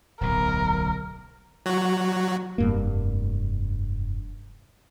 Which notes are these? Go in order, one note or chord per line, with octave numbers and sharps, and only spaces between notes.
D1 B1 A#4
F#3 F#4
F1 G2 A#3